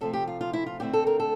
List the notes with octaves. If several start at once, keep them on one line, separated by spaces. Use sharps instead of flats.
C3 F3 A3 A4
G4
F4
F4
E4
F4
D3 A3 C4 E4 G4
A4
A#4
A4